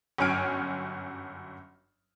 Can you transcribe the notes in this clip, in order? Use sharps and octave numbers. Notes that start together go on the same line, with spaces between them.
G1 F#2 C#5 G#5 F6 D7